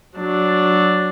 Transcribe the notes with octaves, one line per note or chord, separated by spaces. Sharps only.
F#3 D4